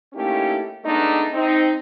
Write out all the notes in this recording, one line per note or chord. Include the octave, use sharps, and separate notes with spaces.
A3 A#3 C#4 D#4 E4 G4
G#3 A3 B3 D4 D#4
C4 D#4